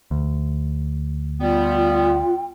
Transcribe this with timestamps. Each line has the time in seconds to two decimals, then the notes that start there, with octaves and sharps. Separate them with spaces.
0.11 D2
1.41 G3 B3 F4 G5